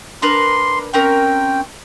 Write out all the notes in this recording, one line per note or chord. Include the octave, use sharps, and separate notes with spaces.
D4 A#4 B4 C6
C4 C#4 A#4 G5